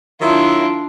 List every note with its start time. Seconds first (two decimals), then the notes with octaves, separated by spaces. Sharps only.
0.21 D#3 F#3 D4 E4 F4